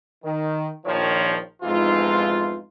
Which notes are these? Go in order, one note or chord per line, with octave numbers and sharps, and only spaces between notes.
D#3
A#1 D#3 F3 C#5
F2 G#2 B2 E3 D#4 F4